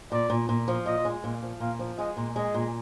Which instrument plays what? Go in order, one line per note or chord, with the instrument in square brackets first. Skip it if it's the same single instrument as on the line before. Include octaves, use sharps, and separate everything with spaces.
[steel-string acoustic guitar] A#2 [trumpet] D5
[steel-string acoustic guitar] A#2
A#2
F3
[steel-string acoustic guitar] A#2 [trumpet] D#5
[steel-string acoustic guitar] G#3
A#2
F3
[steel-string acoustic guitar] A#2 [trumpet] F5
[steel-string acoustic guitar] F3
[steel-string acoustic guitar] G#3 [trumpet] D#5
[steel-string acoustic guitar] A#2
[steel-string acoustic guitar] G#3 [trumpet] D#5
[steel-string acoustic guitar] A#2